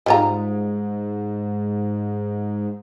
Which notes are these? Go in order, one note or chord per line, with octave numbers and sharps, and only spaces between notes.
G#2 G3 F4 A#5